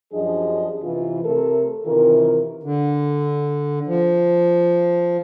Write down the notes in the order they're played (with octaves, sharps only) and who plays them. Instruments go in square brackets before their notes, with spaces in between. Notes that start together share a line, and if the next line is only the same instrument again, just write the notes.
[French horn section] F#2 F3 D4 G4 G#4 D#5
C3 E3 F4
C3 A3 A4 A#4
C3 D#3 E3 F4 A#4
[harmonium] D3
F3